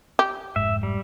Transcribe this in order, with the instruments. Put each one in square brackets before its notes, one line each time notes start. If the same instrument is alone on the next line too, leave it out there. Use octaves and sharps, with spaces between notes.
[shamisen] G4
[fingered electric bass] F1 G#2 [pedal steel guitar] E5
[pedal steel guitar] G3